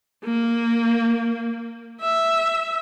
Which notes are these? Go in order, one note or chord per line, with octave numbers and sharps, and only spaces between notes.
A#3
E5